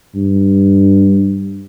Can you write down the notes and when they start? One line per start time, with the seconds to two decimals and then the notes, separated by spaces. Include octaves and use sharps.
0.16 G2